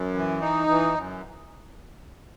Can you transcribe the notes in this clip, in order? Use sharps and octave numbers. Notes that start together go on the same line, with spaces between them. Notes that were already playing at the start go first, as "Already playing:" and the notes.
Already playing: F#2
E3
D#4
E3
F#2